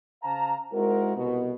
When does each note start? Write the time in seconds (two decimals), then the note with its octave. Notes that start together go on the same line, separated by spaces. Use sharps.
0.23 C#3 C5 F5 A5 A#5
0.72 G#3 C4 D#4 E4 F#4 A#4
1.16 C2 B2